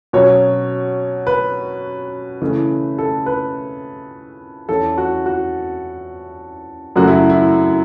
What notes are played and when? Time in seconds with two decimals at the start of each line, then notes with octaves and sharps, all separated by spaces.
0.13 B2 F#3 C#4 C#5
1.27 B4
2.42 C#3 E3 A3
2.98 A4
3.26 B4
4.68 E2 E3 C#4 A4
4.98 F#4
5.26 F#4
6.96 F#2 C#3 F#3 A3 F#4
7.08 E4
7.30 E4